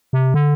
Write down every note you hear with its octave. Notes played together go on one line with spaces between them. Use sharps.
C3
D3